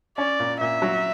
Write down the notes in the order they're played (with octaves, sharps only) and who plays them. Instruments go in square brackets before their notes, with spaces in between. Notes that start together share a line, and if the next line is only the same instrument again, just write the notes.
[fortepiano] C#4 [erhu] D5
[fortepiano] A#2
[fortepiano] A#2 [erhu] E5
[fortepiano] F#3